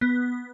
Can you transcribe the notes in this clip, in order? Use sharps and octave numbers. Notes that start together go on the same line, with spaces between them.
B3